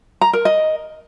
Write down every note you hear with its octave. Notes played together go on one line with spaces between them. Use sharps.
A#5
A#4
D#5